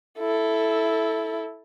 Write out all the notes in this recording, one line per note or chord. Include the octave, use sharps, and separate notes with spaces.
E4 A4